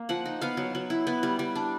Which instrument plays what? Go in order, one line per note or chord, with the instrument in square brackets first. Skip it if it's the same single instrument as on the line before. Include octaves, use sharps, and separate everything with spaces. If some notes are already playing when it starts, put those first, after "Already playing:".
Already playing: [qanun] A#3
F3 F#5
D#4
B3 F5
F#3
F#3
E4
B3
G3
G3
D4